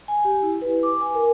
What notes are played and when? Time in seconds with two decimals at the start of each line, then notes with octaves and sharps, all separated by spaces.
0.08 G#5
0.25 G4
0.43 E4
0.62 B4
0.83 D6
1.01 G#5
1.15 A#4